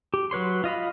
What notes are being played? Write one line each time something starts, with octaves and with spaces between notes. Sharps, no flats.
G4
F#3 B4 C#5 C6
F4 D#5 F5 B5